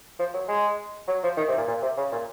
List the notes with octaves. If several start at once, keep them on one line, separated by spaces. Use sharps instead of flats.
F3
F#3
G#3
F#3
F3
D#3
C3
A#2
A#2
C3
C#3
A#2